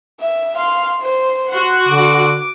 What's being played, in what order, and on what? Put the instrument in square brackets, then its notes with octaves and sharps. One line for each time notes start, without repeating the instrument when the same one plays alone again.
[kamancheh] E5
F5 C6
C5
[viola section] F#4 F#5 [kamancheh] C6
[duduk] D3 [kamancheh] D6